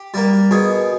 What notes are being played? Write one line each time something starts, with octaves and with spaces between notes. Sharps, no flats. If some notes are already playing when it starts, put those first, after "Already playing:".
Already playing: G4
G3 A#3
B2 G#4